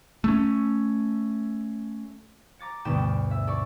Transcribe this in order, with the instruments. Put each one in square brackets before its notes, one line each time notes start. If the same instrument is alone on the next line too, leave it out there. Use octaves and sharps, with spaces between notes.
[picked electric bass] A3 C#4
[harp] A#5 D6 A6 C#7
D2 G2 B2 B3 G5 E7
E5
A4 D5 C#6